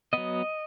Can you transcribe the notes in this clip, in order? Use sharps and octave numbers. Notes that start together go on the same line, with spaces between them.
F#3 B3 D#5